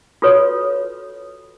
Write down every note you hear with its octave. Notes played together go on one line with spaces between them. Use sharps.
F4 F#4 A4 B4 C#5